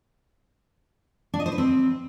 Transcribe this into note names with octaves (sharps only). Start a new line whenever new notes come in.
D4
D#5
C5
B4
C4